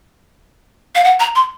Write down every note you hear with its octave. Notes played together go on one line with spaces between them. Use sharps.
F5
F#5
A#5
C6